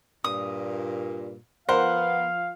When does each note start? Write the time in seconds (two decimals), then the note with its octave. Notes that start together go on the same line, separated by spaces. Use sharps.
0.24 G2 A#2 D#6
1.69 F3 B3 F4 A#4 C5 F5 F#5